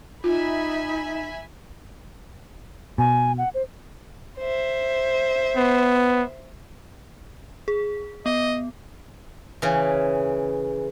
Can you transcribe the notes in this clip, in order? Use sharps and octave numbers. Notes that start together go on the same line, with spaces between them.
D#4 F4 E5 G#5 B5
B2 G#5
F#5
C5
C5 E5
B3
G#4
B3 D#5
C#3 E3